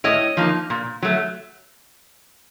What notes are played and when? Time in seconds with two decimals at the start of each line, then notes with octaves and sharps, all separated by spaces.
0.04 A2 C#5 D#5
0.37 F3 A#3 D#4
0.70 A#2
1.02 F#3 A3